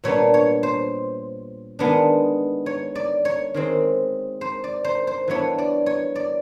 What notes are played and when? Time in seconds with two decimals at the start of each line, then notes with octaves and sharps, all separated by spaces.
0.04 A#2 G3 B3 D4 C#5
0.34 C#5
0.63 C5
1.79 D#3 G#3 B3 D4
2.66 C#5
2.95 D5
3.25 C#5
3.54 D#3 G#3 C4
4.41 C5
4.64 D5
4.84 C5
5.07 C5
5.28 E3 G3 B3 D4 C#5
5.58 D5
5.86 C#5
6.15 D5